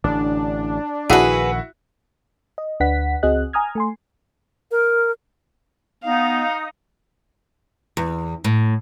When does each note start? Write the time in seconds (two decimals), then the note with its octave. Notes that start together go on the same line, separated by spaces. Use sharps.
0.04 A1 D3 D4
1.10 A#1 D#3 E4 F#4 G#4 B4
2.58 D#5
2.80 D2 D4 B4 F#5 B6
3.23 C#2 C4 F#4 G#4 D#5 F#6
3.53 G#5 A#5 D#6 F6 G#6
3.75 A3 G#5 C6
4.71 A#4
6.04 B3 D#4 F5 D#6
7.97 E2
8.44 A2